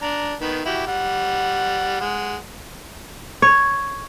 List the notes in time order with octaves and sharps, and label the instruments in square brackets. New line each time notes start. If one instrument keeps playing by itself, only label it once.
[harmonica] D4 A#5
D#3 B3
E4 F#4 G4
G3 F#5
G#3 F#5
[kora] C#5